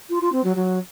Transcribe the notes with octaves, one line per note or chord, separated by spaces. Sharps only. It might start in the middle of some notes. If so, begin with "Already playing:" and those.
F4
F4
C4
F#3
F#3